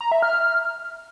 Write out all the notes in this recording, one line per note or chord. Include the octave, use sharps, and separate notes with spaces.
A#5
E5
F6